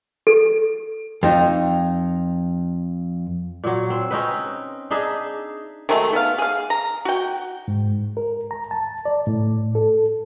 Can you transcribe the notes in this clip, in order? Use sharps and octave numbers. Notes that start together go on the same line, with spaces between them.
A4
F2 D#4
A#2 F#3
C4
C4 C#4 D#4 B4
D4 D#4 G#4 E5
D#3 F#3 G#3 A3
B3 F5
G#4 F5
A#5
F#4 G5
G#2
A#4
A#5
A5
D5
A2
A4